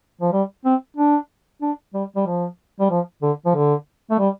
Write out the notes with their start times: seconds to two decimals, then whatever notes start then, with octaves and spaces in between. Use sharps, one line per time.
0.21 F3
0.33 G3
0.65 C4
0.97 D4
1.62 D4
1.94 G3
2.16 G3
2.27 F3
2.80 G3
2.90 F3
3.22 D3
3.46 F3
3.55 D3
4.11 A3
4.19 G3